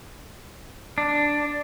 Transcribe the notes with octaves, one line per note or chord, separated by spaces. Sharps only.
D4